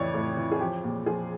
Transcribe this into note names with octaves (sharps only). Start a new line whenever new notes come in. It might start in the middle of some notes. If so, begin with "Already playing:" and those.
Already playing: F2 A2 E3 C#5 D5
A2
E3
G#4
F3 G4
A#2 G4
F3 G#4